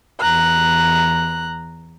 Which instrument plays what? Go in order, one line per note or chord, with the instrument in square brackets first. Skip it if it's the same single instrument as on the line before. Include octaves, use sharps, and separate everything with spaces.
[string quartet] E2 A#5 F#6